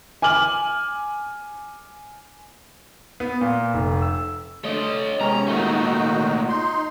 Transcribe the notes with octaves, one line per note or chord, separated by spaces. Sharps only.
G#5 D6 F6 F#7
B3
A#2
F1
E6
A3 D4 C#5 D#5
C3 G#3 B3 C#4 G4 A#5
A#2 D#3 A3 D#4 F#4
D#4 C6